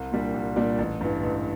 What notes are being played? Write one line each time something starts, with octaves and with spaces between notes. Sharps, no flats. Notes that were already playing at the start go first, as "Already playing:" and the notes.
Already playing: C2
A#2 G3 D4
C2
A#2 G3 D4
A1
G2 E3
A1